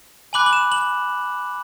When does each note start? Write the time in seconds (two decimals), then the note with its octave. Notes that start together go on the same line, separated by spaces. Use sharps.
0.33 G#5 B5 D6 F#6 F#7
0.46 F#7
0.53 E7
0.72 F#7